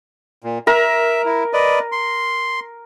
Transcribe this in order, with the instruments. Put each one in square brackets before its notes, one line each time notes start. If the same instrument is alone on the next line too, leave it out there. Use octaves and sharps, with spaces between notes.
[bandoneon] A#2
[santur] A#4 [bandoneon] E5
[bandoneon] E4
B4 D5 D#5
C6